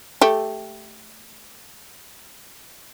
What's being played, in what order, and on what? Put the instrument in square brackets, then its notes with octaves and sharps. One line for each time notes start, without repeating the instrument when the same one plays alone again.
[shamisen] A3 G4